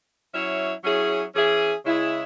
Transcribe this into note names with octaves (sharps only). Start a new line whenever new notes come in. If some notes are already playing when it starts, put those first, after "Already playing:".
F#3 C#4 E4 C#5 E5
F#3 C#4 E4 G#4
E3 C#4 G#4 E5
C#3 G#3 E4 G#4